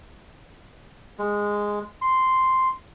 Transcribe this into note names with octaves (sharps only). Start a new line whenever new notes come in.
G#3
C6